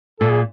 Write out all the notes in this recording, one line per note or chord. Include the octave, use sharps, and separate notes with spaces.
A#2 A4
G#4